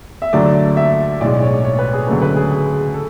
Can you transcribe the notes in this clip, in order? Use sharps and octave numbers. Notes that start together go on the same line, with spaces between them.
E5
D2 D3 F#3 A3 D5
E5
B1 A2 G#3 D5
C#5
C#5
B4
G#4
D2 C#3 F#3 A3 B4
B4
G#4
G#4
A4